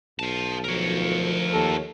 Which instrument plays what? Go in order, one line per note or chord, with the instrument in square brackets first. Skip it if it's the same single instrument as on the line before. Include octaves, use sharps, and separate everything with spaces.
[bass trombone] B1 [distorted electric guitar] F5 A5
[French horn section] D2 D#3 F3 [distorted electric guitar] A#4 C#5
[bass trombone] D#2 [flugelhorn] A4